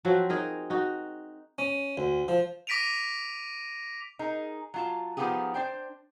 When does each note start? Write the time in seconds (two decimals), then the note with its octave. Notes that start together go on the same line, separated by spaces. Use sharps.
0.05 F3 F#3 C4 F#4
0.29 D#4 G#4 A#4
0.70 D#4 F#4
1.58 C#4
1.97 D2
2.28 F3
2.67 D6 A#6 B6 D7 D#7 F7
4.19 D#4 G#4 A#4
4.74 F#3 F4 A5
5.17 D#3 F3 B3 F4 G4 G#4
5.54 D4 C5 G5